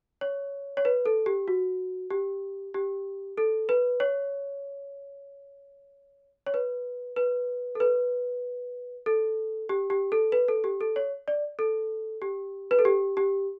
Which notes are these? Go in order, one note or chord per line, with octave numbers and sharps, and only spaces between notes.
C#5
C#5
B4
A4
G4
F#4
G4
G4
A4
B4
C#5
C#5
B4
B4
A4
B4
A4
G4
G4
A4
B4
A4
G4
A4
C#5
D5
A4
G4
B4
A4
G4
G4